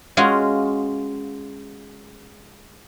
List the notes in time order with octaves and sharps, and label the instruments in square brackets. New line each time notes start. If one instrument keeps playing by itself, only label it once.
[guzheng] G#3 C#4 F4 F#4